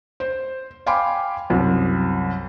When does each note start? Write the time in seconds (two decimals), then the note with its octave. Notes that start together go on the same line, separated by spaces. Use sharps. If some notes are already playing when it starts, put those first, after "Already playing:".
0.20 C5
0.86 F5 G5 G#5 B5 C6 D6
1.50 C2 F#2